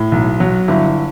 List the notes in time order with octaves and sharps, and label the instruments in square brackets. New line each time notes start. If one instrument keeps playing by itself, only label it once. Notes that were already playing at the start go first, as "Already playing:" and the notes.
Already playing: [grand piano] A2
B1
F#3
G1 E4